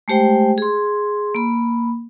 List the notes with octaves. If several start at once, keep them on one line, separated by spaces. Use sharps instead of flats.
G#3 A3 G4 C5 G5
G#4 C6
A#3 B5